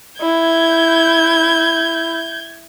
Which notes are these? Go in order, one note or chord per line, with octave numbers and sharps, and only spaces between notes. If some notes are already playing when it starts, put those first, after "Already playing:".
E4 G6 G#6